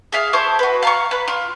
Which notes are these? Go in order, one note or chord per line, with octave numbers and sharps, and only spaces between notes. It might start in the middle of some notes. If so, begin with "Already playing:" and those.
G#4 E5 F5
E4 C5 A5 C#6
F#4 B4
F5 A#5 C#6
B4
F4